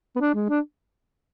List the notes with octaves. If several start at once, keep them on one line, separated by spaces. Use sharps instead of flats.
B3
D4
G#3
D4